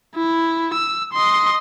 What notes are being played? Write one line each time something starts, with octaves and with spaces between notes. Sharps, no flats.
E4
E6
D#5 C6